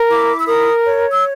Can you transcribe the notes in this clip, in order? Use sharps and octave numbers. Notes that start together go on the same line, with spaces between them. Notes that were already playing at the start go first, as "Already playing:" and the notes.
Already playing: A#4
E4 D6
E6
A#4 D#6
C#5
E6